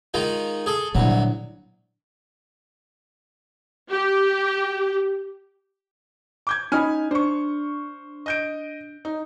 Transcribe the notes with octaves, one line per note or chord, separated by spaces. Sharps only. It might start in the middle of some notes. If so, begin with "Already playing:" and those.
D#3 G#3 F4
G#4 A4
C2 A#2 D3 F#3
G4
D6 G6 G#6
C#4 D#4 G#5 B5 F6 G#6
D4 C5 C#6
D#5 G6 D7
D#4